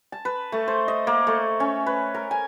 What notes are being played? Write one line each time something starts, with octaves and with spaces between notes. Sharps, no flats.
A5
B4
A3
C5
D#5
A#3
A3
C#4
B4
A#4
G#5